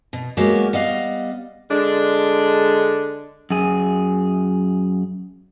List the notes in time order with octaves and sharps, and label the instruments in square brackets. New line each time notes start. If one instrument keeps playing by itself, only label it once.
[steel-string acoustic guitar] B2
F#3 G#3 A#3 B3 F#4 G4
G3 B3 D#5 F5
[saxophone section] D3 G#3 D4
[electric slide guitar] F#2 G#4